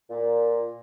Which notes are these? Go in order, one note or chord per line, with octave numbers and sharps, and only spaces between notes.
A#2